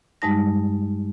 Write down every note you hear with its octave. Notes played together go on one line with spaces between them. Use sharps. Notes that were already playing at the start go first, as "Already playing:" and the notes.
G2 G3 G#3 D#4 A5 A#6